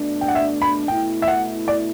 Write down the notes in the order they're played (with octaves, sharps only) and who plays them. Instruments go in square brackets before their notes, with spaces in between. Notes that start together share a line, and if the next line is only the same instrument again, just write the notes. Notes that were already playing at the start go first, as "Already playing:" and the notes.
Already playing: [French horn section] B2 A3 D4
[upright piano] G5
F#5
E5
B5
[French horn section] B2 A3 E4 [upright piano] G5
[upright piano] E5
F#5
D5